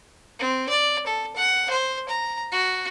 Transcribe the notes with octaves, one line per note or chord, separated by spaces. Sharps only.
C4
D5
A4
F#5
C5
A#5
F#4